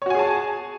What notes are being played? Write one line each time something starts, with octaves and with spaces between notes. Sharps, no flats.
F#4 G#4 C#5 G#5 A5